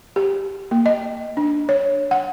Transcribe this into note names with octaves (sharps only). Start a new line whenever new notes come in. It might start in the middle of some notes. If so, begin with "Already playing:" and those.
G4
A#3
D#5
D4
C#5
F#5